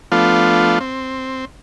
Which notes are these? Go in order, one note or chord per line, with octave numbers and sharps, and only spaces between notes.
F3 A3 B3 D4 F4
C4